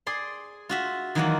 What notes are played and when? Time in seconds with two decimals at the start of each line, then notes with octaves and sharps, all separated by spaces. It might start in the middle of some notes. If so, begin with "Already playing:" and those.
0.07 G#4 D5 C6
0.69 F4 F#4 E5
1.15 D#3 E3 F#3 A#3 F4 F#5